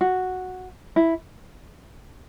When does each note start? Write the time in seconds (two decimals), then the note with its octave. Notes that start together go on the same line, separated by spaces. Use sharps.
0.01 F#4
0.96 E4